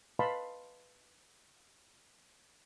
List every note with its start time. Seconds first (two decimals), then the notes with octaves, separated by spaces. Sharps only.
0.19 B4 D#5 F5 A5 B5 C6